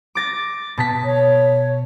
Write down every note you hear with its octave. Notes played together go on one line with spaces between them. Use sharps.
D6 A6 A#6
B2 A5 B6
C#5